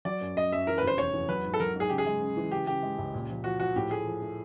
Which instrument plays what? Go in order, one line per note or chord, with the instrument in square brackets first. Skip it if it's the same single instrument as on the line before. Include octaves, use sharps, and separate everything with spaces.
[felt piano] F#3 [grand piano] D5
[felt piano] F#2
[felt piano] F#2 [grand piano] D#5
[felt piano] F#2 [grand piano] E5
[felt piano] E3 [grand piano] A#4
[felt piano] F1 [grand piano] B4
[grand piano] C5
[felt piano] E2 [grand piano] C#5
[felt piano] E2
[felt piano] F#3 [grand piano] B4
[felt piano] G#2
[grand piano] A4
[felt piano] F#3 [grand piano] A#4
[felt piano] G#2 [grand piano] G#4
[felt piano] C#3 [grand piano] G4
[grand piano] G#4
[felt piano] G#3
C#3
E3
[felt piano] C#3 [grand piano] G4
[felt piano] C#3 [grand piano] G4
[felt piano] G#3
C#2
A#2
F3
[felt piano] F3 [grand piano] F#4
[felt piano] F3 [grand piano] F#4
[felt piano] A2 [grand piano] G4
[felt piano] A3 [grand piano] G#4
[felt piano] F3
A3